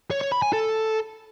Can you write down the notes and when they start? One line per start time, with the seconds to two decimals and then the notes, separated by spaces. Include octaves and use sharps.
0.11 C#5
0.21 C#5
0.32 B5
0.42 G#5
0.53 A4